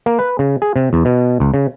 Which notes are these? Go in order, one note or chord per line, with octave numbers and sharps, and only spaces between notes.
A#3
B4
C#3
G#4
C3
E2
B2
C#2
C#3